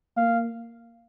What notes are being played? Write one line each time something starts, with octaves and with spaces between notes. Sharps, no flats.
A#3 F5